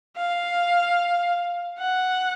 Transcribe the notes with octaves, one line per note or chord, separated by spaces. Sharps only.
F5
F#5